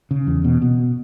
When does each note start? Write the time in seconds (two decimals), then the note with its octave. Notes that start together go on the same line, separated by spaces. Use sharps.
0.11 C#3
0.27 E2
0.44 B2
0.62 B2